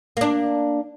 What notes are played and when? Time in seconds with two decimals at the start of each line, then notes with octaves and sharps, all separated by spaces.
0.17 A#3 D4